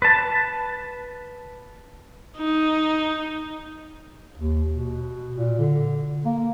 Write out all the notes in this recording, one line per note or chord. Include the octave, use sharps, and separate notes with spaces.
B4 A5
D#4
D#2
B2
A#2
D3
A#3